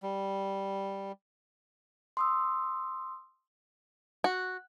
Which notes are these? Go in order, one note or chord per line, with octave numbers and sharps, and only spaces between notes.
G3
C6 D#6 E6
F#4